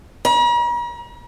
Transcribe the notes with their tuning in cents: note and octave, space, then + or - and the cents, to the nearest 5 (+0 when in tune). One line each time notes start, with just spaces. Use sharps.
A#5 +45